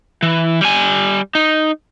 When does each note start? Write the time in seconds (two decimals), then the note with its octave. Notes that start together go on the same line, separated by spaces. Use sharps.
0.22 E3
0.61 G3 G#5
1.35 D#4